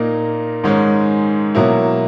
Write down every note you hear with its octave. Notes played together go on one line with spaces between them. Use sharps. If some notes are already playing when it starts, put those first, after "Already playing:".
Already playing: A#2 A#3 D#4 A#4
G#2 D#3 G#3 C#4
B2 F#3 A#3 E4